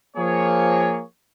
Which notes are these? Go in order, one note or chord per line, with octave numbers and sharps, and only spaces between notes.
F3 A#3 G#4 C#5